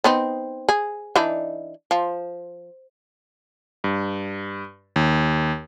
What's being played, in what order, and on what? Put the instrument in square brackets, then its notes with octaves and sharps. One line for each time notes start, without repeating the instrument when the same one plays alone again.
[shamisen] B3 C4 D#4
G#4
E3 D4 D#4
F3
[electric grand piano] G2
D#2